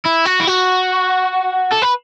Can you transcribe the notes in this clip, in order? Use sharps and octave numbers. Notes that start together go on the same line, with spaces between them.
E4
F#4
E4
F#4
A4
B4